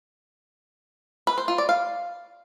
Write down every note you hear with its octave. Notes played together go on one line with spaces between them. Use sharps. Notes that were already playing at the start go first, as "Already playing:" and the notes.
B4
C5
F4
D5
F5